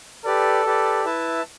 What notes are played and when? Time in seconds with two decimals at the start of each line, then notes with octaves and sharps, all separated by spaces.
0.25 G4 A4 B4 D5
0.65 G4 B4 D5
1.05 E4 B4 E5 A5